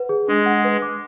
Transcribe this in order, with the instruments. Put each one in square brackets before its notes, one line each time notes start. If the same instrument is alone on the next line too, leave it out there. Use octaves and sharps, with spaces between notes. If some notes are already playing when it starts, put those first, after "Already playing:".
Already playing: [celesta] B4 F#5
G#4
[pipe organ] G#3 [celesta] D4
[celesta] F#5
B4
D6